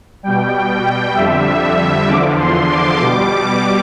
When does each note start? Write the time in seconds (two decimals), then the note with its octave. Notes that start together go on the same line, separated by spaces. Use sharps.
0.23 B2 G3 G5
1.15 F2 D3 G3 E5
1.61 E5
2.08 E2 D3 F3 D6
2.39 C6
2.70 D6
3.00 B2 G3